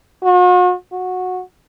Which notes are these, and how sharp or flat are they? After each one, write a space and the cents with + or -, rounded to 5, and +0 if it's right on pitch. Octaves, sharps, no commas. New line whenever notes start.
F#4 -45
F#4 -15